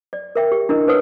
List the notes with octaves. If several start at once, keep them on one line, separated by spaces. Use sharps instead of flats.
D5
A#4 E5 G5
G4
D4 E4 A#4 D#5
D#4 B4 C#5 F#5 D#6 E6